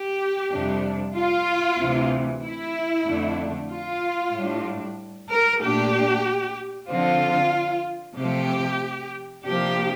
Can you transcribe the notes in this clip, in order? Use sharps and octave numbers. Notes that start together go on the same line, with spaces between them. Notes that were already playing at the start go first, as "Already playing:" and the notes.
Already playing: G4
F2 C3 G3 D4
F4
D2 C3 E3
E4
F2 D3 A3 D4
F4
A2 G3 D4
A#4
A#2 A3 D4 G4
D3 F3 C4 F4
C3 F3 A3 C4 G4
C3 F3 A#3 D4 G4